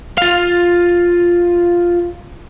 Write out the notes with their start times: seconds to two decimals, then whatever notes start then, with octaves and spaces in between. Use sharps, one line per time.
0.18 F4 F5